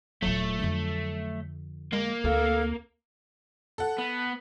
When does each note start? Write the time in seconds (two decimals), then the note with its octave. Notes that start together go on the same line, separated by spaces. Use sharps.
0.23 D#1 A#1 F#3 A3
0.60 F2 D3
1.93 G#3 A#3
2.24 D2 C4 A4 F5
3.78 A4 F#5
3.98 B3